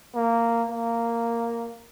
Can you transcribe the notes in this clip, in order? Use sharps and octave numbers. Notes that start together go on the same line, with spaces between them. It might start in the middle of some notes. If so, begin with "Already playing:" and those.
A#3
A#3